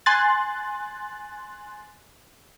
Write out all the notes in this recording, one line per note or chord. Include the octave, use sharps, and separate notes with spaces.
G#5 C6 F#6 A6